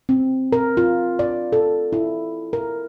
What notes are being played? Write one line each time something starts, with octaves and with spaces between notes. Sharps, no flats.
C4
A#4
F4
D5
A4
E4
A#4